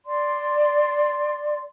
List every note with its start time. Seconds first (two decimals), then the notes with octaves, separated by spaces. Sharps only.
0.05 D5 C6